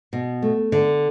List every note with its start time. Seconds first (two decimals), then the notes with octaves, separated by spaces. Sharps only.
0.13 B2
0.42 A3
0.72 D3